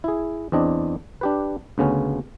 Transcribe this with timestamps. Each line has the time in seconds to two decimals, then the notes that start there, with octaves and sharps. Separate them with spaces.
0.04 E4 G#4
0.52 E2 C4 D4 D#5
1.21 D4 G4 B4
1.78 D2 C#3 B3 C#4